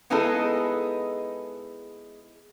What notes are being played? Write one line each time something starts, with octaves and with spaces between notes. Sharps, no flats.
G#3 B3 D#4 E4 G#4 A4